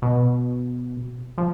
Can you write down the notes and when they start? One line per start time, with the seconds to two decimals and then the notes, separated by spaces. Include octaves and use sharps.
0.02 B2
1.38 F3